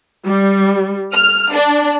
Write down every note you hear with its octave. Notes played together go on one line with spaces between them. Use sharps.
G3
F6
D4